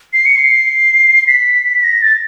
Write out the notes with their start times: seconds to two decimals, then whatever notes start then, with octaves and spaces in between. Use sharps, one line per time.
0.13 C7
0.26 C#7
0.38 C7
1.27 B6
1.79 B6
1.84 A#6
2.02 A6